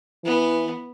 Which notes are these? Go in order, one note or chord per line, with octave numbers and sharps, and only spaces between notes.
E3 B3